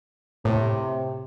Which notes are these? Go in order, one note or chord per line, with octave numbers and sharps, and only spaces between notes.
A2 C3